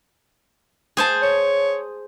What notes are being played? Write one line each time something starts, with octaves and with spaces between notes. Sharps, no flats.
G#4 C5 A5
C#5